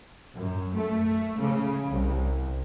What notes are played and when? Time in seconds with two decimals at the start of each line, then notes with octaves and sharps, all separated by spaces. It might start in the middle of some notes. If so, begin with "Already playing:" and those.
0.36 F#2
0.75 A3
1.43 C#3
1.95 C2